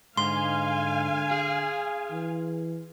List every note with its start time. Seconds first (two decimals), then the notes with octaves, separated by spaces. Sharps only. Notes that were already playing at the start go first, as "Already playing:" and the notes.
0.17 G#2 D3 F5 G#5 C6
1.31 G#4
2.11 E3